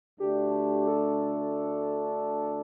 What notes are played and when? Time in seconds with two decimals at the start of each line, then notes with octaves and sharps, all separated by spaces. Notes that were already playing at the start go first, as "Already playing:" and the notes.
0.20 D2 D3 A3 D4 G4
0.87 A4